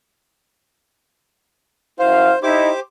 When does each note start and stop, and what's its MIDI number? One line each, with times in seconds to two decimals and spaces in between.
1.99 2.33 42
1.99 2.33 64
1.99 2.39 72
1.99 2.33 77
2.43 2.71 63
2.43 2.71 64
2.43 2.80 67
2.43 2.80 72
2.43 2.80 86